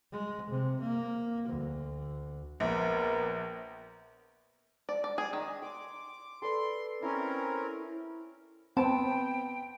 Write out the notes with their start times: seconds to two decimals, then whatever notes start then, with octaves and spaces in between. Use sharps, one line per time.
0.12 G#3
0.50 C3
0.81 A#3
1.48 D2
2.60 A#1 B3 A#4
4.89 D5
5.04 D5
5.18 G#4
5.33 D#3
5.62 C6 D6
6.42 A4 B4 D5 C6
7.02 C4 C#4 E4 A#4
8.77 B3 C4 G5 A5